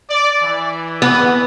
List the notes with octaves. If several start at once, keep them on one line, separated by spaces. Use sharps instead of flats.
D5
E3
B3